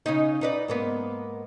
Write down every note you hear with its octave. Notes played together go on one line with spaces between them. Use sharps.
C#3 C#4 D#4
D#4 B4 D5
G#2 A#3 B3